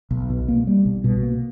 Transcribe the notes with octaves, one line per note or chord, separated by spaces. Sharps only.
B1
B2
A#3
G3
B1
B2
A#3